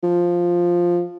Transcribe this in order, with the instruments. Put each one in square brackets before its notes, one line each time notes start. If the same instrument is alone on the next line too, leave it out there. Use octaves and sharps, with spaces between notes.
[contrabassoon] F3